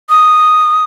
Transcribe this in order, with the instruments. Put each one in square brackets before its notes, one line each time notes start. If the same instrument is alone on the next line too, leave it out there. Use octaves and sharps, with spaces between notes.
[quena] D#6